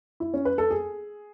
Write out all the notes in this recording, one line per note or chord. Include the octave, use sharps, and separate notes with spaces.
E4
C#4
B4
A4
G#4